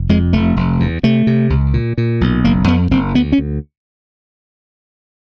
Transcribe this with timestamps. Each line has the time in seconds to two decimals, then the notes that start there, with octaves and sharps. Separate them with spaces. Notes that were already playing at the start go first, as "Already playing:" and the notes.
Already playing: F1
0.09 F2 G#3
0.33 F1 A3
0.56 F1
0.80 E2
1.03 C3 A3
1.27 C3
1.50 C#2
1.74 A#2
1.98 A#2
2.21 B1
2.44 F#1 A#3
2.68 F2 B3
2.91 F#1 C4
3.14 D2 B3
3.32 C#4
3.38 D2